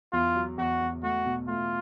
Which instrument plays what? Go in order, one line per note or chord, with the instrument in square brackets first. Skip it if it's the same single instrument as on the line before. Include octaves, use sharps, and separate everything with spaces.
[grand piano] E2 [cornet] F4
[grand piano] F#3
[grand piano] E2 [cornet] F#4
[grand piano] E2
[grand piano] A3 [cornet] F#4
[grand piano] B2
[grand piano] A3 [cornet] F4